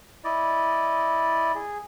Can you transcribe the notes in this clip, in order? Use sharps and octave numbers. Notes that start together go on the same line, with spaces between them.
E4 D5 D#5
G#4